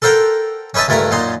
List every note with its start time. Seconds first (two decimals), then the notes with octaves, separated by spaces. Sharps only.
0.02 A4 A#4 C5 F#5 G5 A#5
0.74 C#4 D#4 B4 E5 A5
0.88 C#2 G2 A3 E4 A#4 A#5
1.11 F#2 A#2 D#4 C6